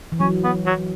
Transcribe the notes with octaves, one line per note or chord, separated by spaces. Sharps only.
E3
F#3 C#4
B3
F#3